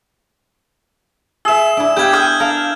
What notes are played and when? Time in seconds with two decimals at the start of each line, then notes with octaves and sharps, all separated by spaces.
1.45 G#4 E5 E6 E7
1.77 D4 E4
1.97 B3 G4 B4 F5 G5 G6 G#6
2.13 D#6 F6 G6
2.40 D4 A#4 F5